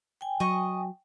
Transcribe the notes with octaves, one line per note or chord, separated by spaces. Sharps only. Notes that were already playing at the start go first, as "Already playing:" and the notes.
G5 G#5
F#3 D#5 C#6